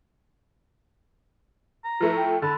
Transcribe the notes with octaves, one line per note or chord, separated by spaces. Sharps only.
A#5
F3 A3 E4 B4
G5
D3 A5 B5